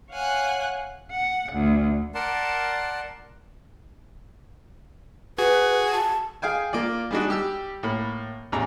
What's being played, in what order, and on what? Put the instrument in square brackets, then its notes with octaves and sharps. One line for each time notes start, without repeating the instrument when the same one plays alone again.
[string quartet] C#5 F5 F#5 G#5 F#6
F#5
D2
[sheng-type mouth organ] A#4 D5 F#5 A5 C6
[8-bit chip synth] F#4 G#4 G#6 [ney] B4
[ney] A5
[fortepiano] G#4 F5 G5 G#5
A#3 F4 D5
G3 G#3 D4 D#4 F#4
G3 G4 E6
A2 A#3 B5
A1 E2 A#5